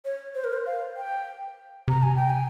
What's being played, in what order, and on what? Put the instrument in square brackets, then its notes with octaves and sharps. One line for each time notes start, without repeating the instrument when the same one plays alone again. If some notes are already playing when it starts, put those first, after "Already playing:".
[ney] C#5
C5
A#4
C5
F5
G5
[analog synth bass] C3 [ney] A#5
[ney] G#5
G5
G#5